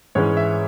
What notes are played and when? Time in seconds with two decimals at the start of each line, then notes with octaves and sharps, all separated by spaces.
0.15 G#2 E3 G#3 C#4 C#5
0.37 E5